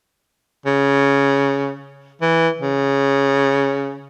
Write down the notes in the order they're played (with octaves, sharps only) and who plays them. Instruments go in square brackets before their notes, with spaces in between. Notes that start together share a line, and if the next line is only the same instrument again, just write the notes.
[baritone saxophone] C#3
E3
C#3